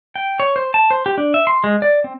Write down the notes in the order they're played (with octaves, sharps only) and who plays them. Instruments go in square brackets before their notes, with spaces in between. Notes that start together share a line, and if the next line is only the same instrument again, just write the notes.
[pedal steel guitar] G5
C#5
C5
A5
C5
G4
D4
E5
C6
G#3
D5
C4